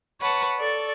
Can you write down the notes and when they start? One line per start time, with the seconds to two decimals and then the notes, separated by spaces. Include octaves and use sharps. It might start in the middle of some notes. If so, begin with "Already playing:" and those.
0.20 B4 C#5 F#5 A5
0.59 A4 D5 C#6